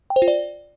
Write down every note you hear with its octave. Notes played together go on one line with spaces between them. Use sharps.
G5
C5
F4
D5